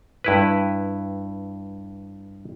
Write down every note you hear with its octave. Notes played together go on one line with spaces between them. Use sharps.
G2 E4 B4